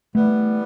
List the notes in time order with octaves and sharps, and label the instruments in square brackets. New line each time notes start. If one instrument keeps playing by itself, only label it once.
[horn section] E3 G3 B3 [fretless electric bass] A3